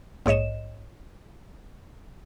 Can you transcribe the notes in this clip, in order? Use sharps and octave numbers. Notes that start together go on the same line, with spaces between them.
A#1 G#2 C#5 D#5 E7